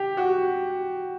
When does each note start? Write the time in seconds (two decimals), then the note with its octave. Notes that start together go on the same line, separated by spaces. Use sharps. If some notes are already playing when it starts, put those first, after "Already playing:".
Already playing: G4
0.17 F#4